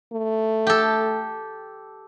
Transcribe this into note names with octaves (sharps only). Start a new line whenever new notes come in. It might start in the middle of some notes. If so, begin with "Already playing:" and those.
A3
G4 A4